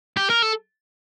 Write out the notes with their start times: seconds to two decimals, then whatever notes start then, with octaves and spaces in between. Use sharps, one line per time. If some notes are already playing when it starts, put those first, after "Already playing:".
0.17 G4
0.30 A#4
0.42 A4